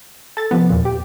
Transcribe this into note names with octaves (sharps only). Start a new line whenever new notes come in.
A4 A6
C3 F3 B3
E2 A#2
G4